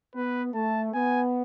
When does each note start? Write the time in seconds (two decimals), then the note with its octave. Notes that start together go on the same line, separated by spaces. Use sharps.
0.15 B3 B4
0.54 A3 A5
0.94 B3 G#5